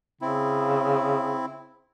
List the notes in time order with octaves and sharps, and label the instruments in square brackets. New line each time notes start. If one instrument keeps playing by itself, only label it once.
[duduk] C#3 [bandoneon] C4 E4